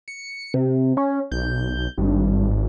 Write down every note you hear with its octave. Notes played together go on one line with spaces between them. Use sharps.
C#7
C3
C#4
B1 G6
G#1 G2